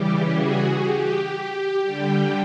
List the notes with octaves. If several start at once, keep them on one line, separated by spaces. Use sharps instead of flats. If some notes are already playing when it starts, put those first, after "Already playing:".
Already playing: C#3 E3 G3 G4
F#4 G#4
G4
D3 G3 G4